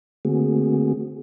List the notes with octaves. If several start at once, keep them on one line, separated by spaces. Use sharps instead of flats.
D3 A3 A#3 C4 F#4 G#4